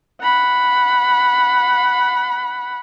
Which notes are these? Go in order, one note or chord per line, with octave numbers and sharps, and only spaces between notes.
F#5 B5